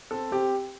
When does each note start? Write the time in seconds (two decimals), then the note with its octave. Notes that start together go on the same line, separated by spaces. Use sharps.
0.11 C4 A4
0.32 C4 G4